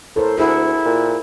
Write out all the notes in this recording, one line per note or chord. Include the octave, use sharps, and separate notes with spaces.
A2 A4 A#4 C5
D2 E4 G#4 F#5
A#2